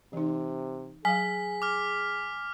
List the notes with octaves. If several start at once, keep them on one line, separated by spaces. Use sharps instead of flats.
C3 E3 D#4
F#3 G#4 F5 G#5 B6
D6 F6